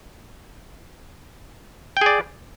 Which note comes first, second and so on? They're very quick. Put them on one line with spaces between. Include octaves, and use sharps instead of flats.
G5 G#4 D5